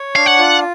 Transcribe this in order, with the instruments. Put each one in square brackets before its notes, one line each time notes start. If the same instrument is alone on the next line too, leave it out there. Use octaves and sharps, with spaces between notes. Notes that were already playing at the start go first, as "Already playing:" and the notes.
Already playing: [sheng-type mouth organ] C#5
[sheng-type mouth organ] D4 [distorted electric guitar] F5
[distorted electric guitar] F#5
[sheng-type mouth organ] F4